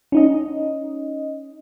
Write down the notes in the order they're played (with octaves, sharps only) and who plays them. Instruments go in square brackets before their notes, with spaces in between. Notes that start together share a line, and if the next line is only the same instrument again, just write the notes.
[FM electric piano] C#4 D#4 D#5